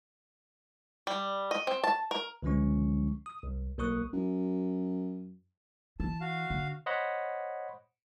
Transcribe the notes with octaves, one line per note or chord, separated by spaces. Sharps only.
G3
D#5
C4
A5
A#4
C#2 D3 F3 G#3 C#4 C#6
D#6
C2
B1 A#3 A#4 C#6 D#6 F#6
F#2
E3 A5
F#4 F5
D3
C5 C#5 D#5 F#5 B5